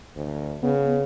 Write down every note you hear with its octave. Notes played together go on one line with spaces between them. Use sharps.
D2
C#3 B3